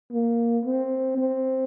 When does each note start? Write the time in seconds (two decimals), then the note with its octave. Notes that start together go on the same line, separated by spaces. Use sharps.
0.12 A#3
0.65 C4
1.18 C4